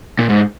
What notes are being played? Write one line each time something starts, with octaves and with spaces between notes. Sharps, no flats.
A#2
G#2